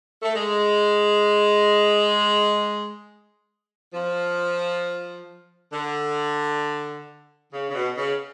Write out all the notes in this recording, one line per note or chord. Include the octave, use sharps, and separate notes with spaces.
A3
G#3
F3
D3
C#3
C#3
B2
C#3